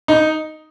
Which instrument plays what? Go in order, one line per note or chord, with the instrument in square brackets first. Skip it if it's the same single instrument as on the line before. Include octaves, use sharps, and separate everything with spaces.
[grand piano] D#4